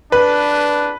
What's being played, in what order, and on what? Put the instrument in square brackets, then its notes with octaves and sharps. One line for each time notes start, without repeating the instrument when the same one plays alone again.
[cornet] D4 [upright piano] B4